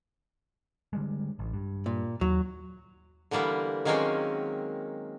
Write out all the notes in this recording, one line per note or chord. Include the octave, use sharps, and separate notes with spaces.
D3 G3 G#3
A1
G2
A#2
D#2 F#3
D3 E3 G3 A#3 B3
D#3 F#3 G#3 A#3 C4 C#4